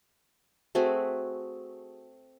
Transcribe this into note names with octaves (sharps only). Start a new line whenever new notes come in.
A3 C4 F#4 G#4